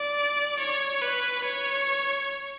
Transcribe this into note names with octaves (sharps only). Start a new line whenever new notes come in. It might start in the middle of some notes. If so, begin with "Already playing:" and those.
Already playing: D5
C#5
B4
C#5